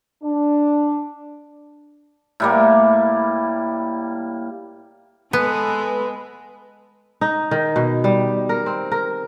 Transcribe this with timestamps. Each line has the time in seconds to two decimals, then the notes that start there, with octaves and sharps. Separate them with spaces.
0.23 D4
2.40 A2 G3 A#3
5.33 G#3 B3 A4 B4
7.21 D#4
7.51 D#3
7.76 B2
8.04 G3
8.49 A#4
8.66 C4
8.92 A#4